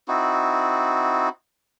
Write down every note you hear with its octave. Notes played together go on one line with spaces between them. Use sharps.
C4 D#4 E4 F#4